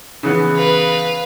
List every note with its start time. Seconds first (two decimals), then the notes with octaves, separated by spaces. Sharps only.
0.23 C#3 E3 B3
0.56 B4 F5